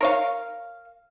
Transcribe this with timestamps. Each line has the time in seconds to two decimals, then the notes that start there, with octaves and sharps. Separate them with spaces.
0.01 A#4 C#5 F5